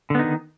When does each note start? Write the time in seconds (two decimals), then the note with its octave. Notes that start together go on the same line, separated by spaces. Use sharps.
0.10 D3
0.15 B3
0.19 D#4
0.24 D#3